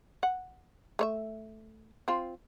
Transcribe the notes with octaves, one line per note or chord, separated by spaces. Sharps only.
F#5
A3 C#5 E5
C4 F4